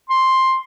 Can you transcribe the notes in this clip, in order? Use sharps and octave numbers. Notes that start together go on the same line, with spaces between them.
C6